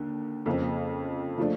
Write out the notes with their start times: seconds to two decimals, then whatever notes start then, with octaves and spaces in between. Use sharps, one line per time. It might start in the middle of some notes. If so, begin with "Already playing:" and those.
Already playing: D#2 D3
0.46 F2 C#3 F3 A#3
1.37 C#3 F3 A3 D4